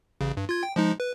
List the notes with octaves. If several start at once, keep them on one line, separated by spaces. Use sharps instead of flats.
A1 C#3
G2
F4 G#6
G5
F3 G#3 D#4
B4